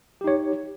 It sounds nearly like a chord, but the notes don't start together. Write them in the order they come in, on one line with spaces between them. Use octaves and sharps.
G4 D#4 C#5